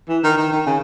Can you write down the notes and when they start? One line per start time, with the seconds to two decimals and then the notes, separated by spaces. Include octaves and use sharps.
0.08 E3
0.23 D#3
0.38 D#3
0.52 D#3
0.66 C#3